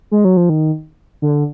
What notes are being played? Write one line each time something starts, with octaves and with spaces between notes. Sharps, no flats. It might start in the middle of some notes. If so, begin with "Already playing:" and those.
G#3
F#3
F3
D#3
D3